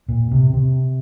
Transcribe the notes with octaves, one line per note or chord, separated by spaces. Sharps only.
A#2
C3
C3